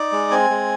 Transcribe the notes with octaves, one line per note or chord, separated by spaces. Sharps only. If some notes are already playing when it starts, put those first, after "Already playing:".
Already playing: D#4 D5
G#3
C4 G#5
G#3